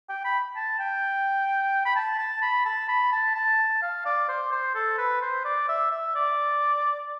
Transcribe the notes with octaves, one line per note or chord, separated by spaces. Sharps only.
G5
B5
A5
G5
B5
A5
A5
B5
A5
B5
A5
A5
F5
D5
C5
C5
A4
B4
C5
D5
E5
E5
D5